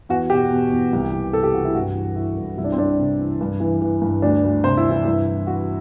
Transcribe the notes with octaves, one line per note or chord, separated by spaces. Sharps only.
E2 F#4
B2 G4
B2
E2
C2
C2
C3 A4
G4
E3 F#4
E4
G2 F#4
E3
E3 E4
G2
C2 E4
D4
C4
C2 D4
C3
E3
G2
E3
E3
G2
D2 D4
D2
C3 C5
E4
E3
E4
G2 E4
E3
E3 F#4